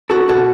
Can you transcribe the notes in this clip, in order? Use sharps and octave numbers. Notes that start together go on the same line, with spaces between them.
F#4 A4
B2 F#4 A4